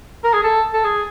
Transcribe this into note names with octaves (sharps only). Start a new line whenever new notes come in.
A#4
G#4
A4
A4
G#4